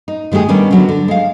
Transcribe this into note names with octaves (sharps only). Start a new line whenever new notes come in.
D#4
D#3 G#3 A3 G4 G#4
D#3 G3 B3 C#4 D4
D3 F#3 B3
D3
G#3 F5